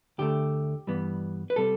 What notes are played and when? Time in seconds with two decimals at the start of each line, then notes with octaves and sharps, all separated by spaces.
0.18 D2 D3 A3 G4
0.87 G2 E3 G3 B3
1.50 B4
1.56 C3 G3 A4